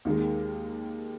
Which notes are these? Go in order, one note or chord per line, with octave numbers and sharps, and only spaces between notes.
D#2 D#3 G#3